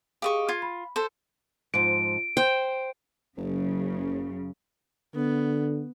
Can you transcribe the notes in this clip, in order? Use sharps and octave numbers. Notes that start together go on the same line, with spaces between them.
G4 G#4 D#5 F5 C#6
F4 G#6
B5
A4 C5
G#2 F3 D7
C5 G5
F#1 F#2 C#3
D3 B3